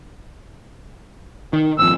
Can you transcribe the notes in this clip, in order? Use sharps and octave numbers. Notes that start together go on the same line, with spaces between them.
D#3
G#1 F2 E6